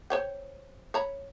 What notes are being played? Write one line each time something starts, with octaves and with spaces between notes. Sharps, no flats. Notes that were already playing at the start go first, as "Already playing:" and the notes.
C5 C#5 G5
C#5 A#5 B5